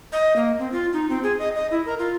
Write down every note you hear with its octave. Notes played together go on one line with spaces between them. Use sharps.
D#5
A#3
C4
F4
D#4
C4
G#4
D#5
D#5
E4
A#4
F4